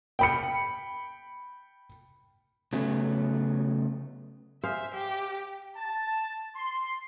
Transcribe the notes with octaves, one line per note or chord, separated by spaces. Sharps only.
G5 B5 C#7
C#3 F#3 A3 B3
G#4 C5 E5 F5
G4
A5
C6